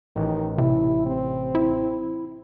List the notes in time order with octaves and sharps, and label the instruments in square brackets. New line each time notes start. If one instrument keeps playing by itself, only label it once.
[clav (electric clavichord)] A1 [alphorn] D#3
[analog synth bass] C3 [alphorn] E4
[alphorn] C4
[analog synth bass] E4